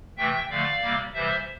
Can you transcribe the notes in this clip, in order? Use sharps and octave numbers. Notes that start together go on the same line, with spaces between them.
C3 E3 A3 E5 G5
D3 F3 A3 D5 F5
C3 G3 A#3
C3 E3 G3 C5 E5